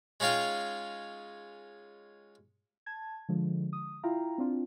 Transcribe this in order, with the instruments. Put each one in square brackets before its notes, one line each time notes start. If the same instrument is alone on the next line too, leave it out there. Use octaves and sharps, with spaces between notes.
[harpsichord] G#3 C#4 D#4 F4 F5 G5
[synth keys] A5 G#6
D3 F3 G#3
D#6
E4 F4 F5 G5 A#5
C4 D4 F4